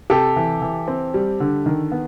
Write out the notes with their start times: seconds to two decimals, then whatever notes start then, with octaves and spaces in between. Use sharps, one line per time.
0.10 C3 G4 A4
0.36 E3
0.62 E3
0.88 C4
1.14 G3
1.40 D3
1.66 D#3
1.92 B3